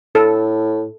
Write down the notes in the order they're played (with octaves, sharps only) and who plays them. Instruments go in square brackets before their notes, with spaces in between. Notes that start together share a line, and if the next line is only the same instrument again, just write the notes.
[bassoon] A2 [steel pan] A4